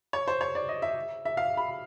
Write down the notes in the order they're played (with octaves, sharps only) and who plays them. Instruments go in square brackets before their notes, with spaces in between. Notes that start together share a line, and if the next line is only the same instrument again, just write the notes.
[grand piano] C#5
C5
C#5
D5
D#5
E5
E5
F5
B5